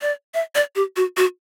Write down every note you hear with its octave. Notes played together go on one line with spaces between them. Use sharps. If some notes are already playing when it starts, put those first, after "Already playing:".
D5
E5
D5
G4
F#4
F#4